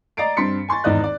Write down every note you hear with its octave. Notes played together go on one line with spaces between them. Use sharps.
D5 D#5 A#5 A6 C7 D7
G2 C4 C6 B6 C#7
G#5 C6 C#6 A6
G#1 E2 D#4 D5 D#5 F#6
D5